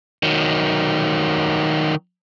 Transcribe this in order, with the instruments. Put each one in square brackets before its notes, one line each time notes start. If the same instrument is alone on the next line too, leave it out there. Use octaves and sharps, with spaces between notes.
[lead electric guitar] D#3 F#3